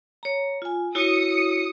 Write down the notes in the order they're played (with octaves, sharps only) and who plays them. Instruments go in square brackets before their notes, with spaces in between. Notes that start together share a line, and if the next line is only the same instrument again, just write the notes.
[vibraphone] C#5 A#5
F4 G#5
[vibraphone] E4 F#4 C#5 [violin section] D#6 C#7